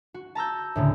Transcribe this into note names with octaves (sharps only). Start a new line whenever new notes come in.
F#4
A5 A#5 E6 G6
D2 A2 C#3